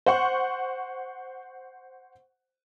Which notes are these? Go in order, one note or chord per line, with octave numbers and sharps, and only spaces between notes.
C5 F#5 C#6